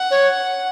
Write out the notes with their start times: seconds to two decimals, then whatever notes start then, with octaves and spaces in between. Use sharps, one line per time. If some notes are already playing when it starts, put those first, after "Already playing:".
Already playing: F#5
0.11 C#5